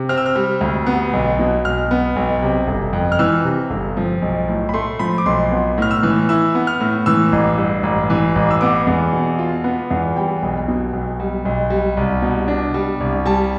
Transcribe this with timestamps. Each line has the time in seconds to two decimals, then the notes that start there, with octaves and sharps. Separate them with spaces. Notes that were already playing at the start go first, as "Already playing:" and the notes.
Already playing: C3
0.09 C4 F6
0.17 E6
0.26 F6
0.36 G3
0.61 D2
0.86 B3
1.13 B1
1.39 B2
1.65 B1 F6
1.91 B3
2.16 B1
2.42 C3
2.68 G1
2.93 F2
3.12 F6
3.19 E3 E6
3.45 C3
3.70 G1
3.97 F3
4.22 B1
4.48 A2
4.69 B5
4.74 A3 C6
4.99 F3 B5
5.18 D6
5.26 B1 C6
5.51 B3
5.78 A2 F6
5.91 E6
6.03 E3
6.29 E4 E6
6.55 B3
6.67 F6
6.80 A2
7.06 E3 E6
7.32 A1
7.58 G2
7.83 A1
8.10 E3
8.35 A1
8.51 E6
8.61 B3 D6
8.87 E2
9.13 B2
9.39 F4
9.64 B3
9.91 E2
10.16 G3 G5
10.42 B1
10.68 B2
10.93 B1
11.20 G3
11.45 B1
11.70 G3
11.97 C2
12.22 B2
12.48 D4
12.74 G3
13.00 C2
13.26 G3 A5